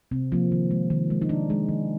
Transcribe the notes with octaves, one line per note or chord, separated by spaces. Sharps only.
C3 C4
F3 A#3
D#3
G#3
D#3
G#3
D#4
D#3 D4
G#3
D#3